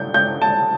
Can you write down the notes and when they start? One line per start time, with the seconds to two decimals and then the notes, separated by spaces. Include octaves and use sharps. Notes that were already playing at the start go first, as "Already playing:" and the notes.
Already playing: G6
0.14 G6
0.42 A5